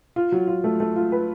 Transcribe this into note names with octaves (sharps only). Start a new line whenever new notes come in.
F4
F#3
F4
A3
A3
F4
B4